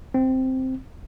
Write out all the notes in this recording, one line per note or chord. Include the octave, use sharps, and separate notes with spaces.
C4